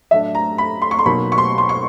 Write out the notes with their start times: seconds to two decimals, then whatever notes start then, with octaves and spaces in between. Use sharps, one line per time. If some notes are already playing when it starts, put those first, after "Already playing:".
0.11 A2 F#3 A3 D4 E5
0.35 A#5
0.58 B5
0.82 C6
0.91 C#6
0.99 C6
1.06 B2 F#3 A#3 D#4 B5
1.32 C#6
1.38 C6
1.58 C6
1.69 C#6